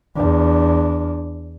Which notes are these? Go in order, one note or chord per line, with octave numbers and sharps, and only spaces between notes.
E2 D4